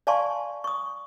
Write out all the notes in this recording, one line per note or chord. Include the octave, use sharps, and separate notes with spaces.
D5 F5 G#5 A5 C6 C#6
C#6 D#6